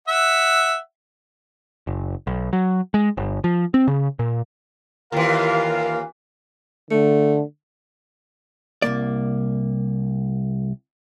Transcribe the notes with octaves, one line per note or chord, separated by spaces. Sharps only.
E5 F#5
F#1
B1
F#3
G#3
G1
F3
C4
C#3
A#2
D#2 E3 F4 A#4 F5
D3 A3
C2 F2 A#3 D5